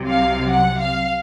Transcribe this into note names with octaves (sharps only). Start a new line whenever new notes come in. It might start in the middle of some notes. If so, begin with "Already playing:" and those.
Already playing: C2 C3 F#3
F5
F#5
F5